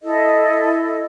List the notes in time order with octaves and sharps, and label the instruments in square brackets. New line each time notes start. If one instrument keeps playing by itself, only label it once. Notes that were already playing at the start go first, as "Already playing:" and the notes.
[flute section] E4 A4 D#5